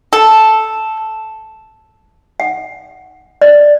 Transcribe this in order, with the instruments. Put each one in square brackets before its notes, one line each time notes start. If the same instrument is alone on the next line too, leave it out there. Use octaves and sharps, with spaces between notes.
[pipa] A4
[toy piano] F#5
D5